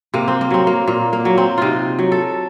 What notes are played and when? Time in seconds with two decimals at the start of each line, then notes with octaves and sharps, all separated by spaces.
0.14 C3 A#3
0.28 C4
0.41 A#3
0.50 F#3 C4
0.67 A#3
0.87 A#2 A#3
1.13 A#3
1.25 F#3
1.38 C4
1.58 C3 D#4 F4
1.99 F#3
2.12 A4